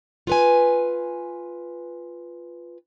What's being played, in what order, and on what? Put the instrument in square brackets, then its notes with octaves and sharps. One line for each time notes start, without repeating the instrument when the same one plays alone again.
[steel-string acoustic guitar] F4 B4 G#5